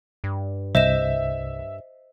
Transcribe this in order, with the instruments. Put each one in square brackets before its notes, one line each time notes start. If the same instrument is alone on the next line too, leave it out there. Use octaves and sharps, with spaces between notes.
[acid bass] G2
[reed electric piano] C2 [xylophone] C5 D#5 E7 [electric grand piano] E5